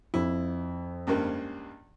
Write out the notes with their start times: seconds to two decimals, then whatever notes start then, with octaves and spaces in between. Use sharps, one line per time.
0.14 F2 E4
1.07 C#2 G2 A#3